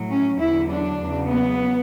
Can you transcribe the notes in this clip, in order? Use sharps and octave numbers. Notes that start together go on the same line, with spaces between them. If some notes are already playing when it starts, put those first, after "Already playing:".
Already playing: A2 F#3
C#4
E2 D3 F#3 E4
D4
E2 C#3 F#3
B3